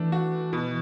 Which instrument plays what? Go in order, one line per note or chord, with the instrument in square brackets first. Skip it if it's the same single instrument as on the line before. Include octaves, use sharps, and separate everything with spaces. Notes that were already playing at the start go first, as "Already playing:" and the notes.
Already playing: [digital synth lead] E3 [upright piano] A3 D4
[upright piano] F#4
B2